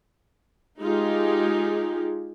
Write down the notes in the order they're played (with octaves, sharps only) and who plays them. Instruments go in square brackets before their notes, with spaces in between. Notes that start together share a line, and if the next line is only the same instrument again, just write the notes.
[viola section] G#3 D#4 F4 G4 G#4